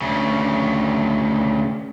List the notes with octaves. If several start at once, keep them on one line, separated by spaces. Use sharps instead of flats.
D2 C#3